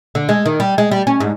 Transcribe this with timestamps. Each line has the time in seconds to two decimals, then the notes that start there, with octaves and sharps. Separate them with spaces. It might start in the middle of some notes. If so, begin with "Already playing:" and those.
0.15 D3
0.29 G#3
0.46 D#3
0.60 G3
0.78 G#3
0.91 G3
1.07 C#4
1.20 G#2